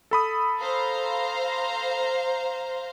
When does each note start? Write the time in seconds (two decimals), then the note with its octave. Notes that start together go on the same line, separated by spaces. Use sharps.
0.11 A4 B5 D#6
0.61 C5 F5 A#5